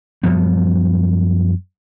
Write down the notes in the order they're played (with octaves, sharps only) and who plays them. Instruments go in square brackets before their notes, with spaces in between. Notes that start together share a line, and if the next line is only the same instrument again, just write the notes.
[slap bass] F#2 F3 G3 B3